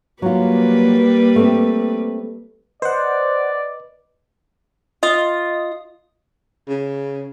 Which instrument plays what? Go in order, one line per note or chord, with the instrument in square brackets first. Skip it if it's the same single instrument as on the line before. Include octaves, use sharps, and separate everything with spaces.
[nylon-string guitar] F#3 F4 [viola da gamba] G3 A#3 B4
[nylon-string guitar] A3 C4
[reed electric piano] B4 D#5 [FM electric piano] C5 F#5 [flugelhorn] D5
[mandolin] F4 [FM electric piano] D#5
[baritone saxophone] C#3